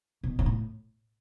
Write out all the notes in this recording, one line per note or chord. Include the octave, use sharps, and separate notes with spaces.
B2
B2
A2